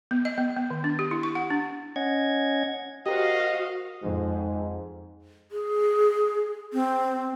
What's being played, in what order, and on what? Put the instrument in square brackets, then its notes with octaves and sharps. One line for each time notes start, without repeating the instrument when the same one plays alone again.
[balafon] B3
D#5
B3
B3
D#3
D4
G4
E4
C#6
F#5
D4
[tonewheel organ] C#4 D#5 F#5 G#6
[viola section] F#4 F5 [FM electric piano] G4 A#4 C5 [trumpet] D#5
[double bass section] F2 [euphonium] G#2
[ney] G#4
C4